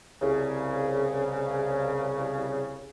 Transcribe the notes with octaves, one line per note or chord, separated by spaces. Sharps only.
C2 C#3